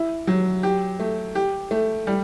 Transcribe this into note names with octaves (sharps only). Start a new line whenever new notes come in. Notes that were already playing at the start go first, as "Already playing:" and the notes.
Already playing: E4
F#3
G4
A3
G4
A3
G3